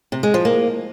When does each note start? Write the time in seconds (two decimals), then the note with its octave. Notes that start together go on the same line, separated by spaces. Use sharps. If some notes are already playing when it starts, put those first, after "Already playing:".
0.12 C3
0.23 G#3
0.34 F3
0.45 A#3